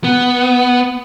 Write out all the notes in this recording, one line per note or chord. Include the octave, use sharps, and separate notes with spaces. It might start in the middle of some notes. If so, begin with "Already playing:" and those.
B3